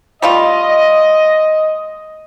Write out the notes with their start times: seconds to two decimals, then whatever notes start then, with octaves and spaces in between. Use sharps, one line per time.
0.22 G3 A3 F4 D#5